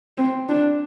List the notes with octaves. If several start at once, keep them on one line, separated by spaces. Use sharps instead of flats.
C4
D4